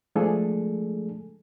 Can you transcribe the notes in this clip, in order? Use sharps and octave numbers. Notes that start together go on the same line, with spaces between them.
F3 G#3 A3 D4 G#4 A4